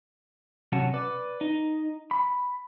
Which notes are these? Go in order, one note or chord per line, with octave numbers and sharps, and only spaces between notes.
B1 C3 F#3 C#4 F#5 A5
B4 D5
D#4
B5